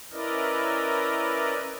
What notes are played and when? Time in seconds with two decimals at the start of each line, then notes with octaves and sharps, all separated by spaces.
0.12 C#4 E4 A#4 B4 D5 D#5